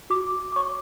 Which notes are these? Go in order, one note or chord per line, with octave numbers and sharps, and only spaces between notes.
F#4 D6
D6
C#5 C#6